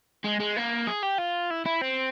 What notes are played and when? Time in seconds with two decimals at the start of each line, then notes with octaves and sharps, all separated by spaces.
0.25 G#3
0.40 G#3
0.57 A#3
0.87 G#4
1.03 G4
1.18 F4
1.50 E4
1.65 E4
1.81 C4